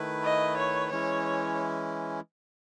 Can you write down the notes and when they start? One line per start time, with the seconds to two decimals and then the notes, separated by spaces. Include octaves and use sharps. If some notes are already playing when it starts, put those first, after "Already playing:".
Already playing: D#3 A3 E4 B4
0.25 D#5
0.57 C#5
0.90 E3 G#3 C#4 E4 C#5